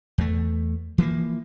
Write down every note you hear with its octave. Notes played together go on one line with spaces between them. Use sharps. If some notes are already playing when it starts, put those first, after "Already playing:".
E2 A3
E3 F3 A3 A#3